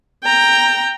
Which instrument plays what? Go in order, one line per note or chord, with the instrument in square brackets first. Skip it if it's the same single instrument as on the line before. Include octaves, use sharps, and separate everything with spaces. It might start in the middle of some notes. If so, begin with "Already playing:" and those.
[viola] G5 A#5